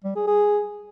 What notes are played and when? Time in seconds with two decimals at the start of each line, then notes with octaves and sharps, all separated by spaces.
0.04 G3
0.16 G#4
0.27 G#4